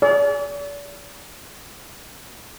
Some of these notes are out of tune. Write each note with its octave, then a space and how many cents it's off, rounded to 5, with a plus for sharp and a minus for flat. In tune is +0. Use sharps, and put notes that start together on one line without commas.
G#4 +0 D5 -40